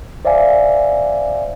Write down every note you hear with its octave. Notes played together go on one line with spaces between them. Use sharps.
C5 D5 E5 F5 G#5